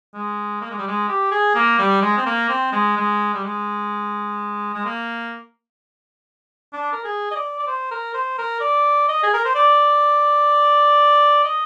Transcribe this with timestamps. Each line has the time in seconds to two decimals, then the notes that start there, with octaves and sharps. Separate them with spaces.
0.14 G#3
0.61 A#3
0.70 G#3
0.78 G3
0.88 G#3
1.09 G4
1.31 G#4
1.55 A#3
1.79 G3
2.02 G#3
2.17 C4
2.26 A#3
2.49 C4
2.73 G#3
2.97 G#3
3.34 G3
3.44 G#3
4.74 G#3
4.85 A#3
6.73 D4
6.93 A#4
7.04 G#4
7.31 D#5
7.36 D5
7.60 D5
7.67 C5
7.91 A#4
8.14 C5
8.38 A#4
8.61 D5
9.08 D#5
9.23 G#4
9.34 A#4
9.45 C5
9.55 D5
11.44 D#5